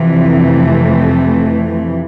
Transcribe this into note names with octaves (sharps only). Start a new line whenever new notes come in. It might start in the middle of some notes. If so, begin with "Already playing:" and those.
Already playing: F2 C3 E3
A3